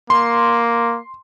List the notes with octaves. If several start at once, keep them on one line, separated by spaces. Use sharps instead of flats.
A#3 C6